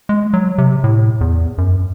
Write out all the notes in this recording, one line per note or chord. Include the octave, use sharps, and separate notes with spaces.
G#3
F#3
C3
A2
E2
F#2